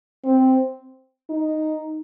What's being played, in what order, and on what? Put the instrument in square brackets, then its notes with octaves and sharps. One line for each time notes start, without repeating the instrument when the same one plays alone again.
[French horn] C4
D#4